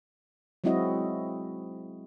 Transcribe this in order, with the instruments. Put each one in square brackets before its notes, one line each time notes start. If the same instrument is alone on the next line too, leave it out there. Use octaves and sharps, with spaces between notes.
[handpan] F#3 G#3 C4 E4 F#4 D#5